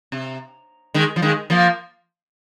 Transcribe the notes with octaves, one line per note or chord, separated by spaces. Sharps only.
C3
D#3 G#3
F3
D#3 G#3
F3 A#3